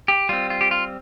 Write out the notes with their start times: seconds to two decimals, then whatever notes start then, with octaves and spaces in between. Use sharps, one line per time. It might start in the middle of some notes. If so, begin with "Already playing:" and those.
0.08 G4
0.29 G3 C4 F4
0.50 F4
0.61 G4
0.71 F4